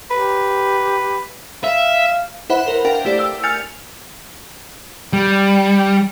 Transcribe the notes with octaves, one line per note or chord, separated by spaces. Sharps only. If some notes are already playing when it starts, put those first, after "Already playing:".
G4 B4
E5 F5
E4 B4 C5 E5 F#5 B5
A#4 C5
D4 A#4 F5 G5
A3 E4 G4 C5 D5
E6
G#5 F6 G6 A6 C#7 F7
G3